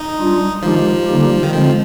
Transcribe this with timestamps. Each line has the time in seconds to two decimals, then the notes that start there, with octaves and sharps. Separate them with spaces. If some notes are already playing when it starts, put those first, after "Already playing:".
Already playing: D#4
0.18 G3 D4 F4
0.62 D#3 F3 G#3 D#4 G4
1.07 D3 G3 A#3 D#4 G4
1.43 D#3
1.52 D3 F3 G#3 C4